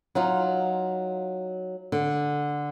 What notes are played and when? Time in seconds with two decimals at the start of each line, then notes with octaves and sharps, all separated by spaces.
0.15 F#3 D#4 F4
1.92 D3